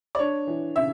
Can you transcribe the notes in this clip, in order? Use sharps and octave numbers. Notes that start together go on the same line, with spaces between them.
D5
D4 C#5
E3
C#3 E5